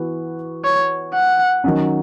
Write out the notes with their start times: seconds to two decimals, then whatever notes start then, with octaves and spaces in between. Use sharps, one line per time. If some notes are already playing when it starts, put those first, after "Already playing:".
Already playing: E3 B3 F#4 B4
0.64 C#5
1.14 F#5
1.64 D#3 F#3 C#4